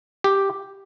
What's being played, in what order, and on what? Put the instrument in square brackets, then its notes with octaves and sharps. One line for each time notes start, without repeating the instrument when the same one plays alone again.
[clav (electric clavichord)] G4